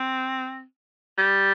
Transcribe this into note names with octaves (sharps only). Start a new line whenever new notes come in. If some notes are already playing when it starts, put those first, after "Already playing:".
Already playing: C4
G3